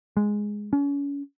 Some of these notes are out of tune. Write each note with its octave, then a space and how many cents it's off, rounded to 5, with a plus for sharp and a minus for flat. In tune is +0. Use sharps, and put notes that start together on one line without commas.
G#3 +0
C#4 +35